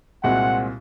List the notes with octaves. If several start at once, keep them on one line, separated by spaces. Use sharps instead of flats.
C2 A#2 G#3 C4 F#4 F#5